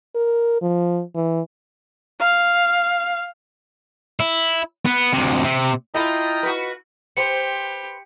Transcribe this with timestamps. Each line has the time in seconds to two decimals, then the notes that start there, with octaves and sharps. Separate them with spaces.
0.15 A#4
0.62 F3
1.15 E3
2.20 F5
4.20 E4
4.85 B3
5.13 D2 C3
5.44 C3
5.94 E4 F4 A4 D#5 G5 A#5 B5 D#6
6.43 F#4 B4
7.17 G4 B4 C5 C#7